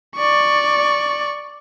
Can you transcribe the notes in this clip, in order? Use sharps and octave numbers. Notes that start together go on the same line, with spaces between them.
D5 C#6